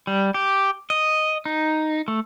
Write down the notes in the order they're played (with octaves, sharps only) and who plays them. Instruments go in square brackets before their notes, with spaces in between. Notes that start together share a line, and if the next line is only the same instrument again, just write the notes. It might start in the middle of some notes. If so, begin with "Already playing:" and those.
[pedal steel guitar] G3
G4
D#5
D#4
A3